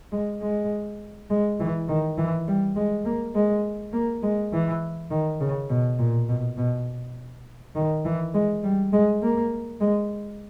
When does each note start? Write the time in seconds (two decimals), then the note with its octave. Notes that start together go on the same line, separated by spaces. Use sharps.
0.12 G#3
0.41 G#3
1.30 G#3
1.60 E3
1.88 D#3
2.18 E3
2.48 G3
2.76 G#3
3.05 A#3
3.35 G#3
3.93 A#3
4.23 G#3
4.53 E3
5.11 D#3
5.41 C#3
5.70 B2
5.99 A#2
6.29 B2
6.57 B2
7.75 D#3
8.05 E3
8.34 G#3
8.64 G3
8.93 G#3
9.22 A#3
9.81 G#3